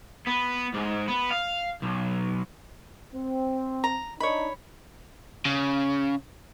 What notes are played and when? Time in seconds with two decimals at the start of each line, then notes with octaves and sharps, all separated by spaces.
0.27 B3
0.74 G#2
1.08 B3
1.31 F5
1.83 B1
3.14 C4
3.84 A#5
4.20 D4 D#4 C#5 B5
5.45 C#3